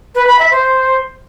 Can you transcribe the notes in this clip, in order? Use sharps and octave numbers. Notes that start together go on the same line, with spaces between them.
B4
B5
E5
C5